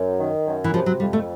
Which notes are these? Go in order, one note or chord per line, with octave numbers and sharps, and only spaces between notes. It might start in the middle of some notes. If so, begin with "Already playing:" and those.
Already playing: F#2
D#3
F#2
E3
C3 F3
F#3
F2 G3
A3